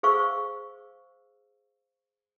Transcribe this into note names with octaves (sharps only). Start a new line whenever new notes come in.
G#4 C5 F5 C#6 E6